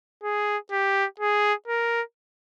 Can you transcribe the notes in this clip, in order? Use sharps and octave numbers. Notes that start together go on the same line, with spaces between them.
G#4
G4
G#4
A#4